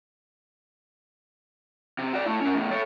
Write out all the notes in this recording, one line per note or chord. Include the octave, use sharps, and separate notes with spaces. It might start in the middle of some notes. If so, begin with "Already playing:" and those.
C3
F#4 D5
A3 E4
C#4 A#4
E2 A2
A4 C#5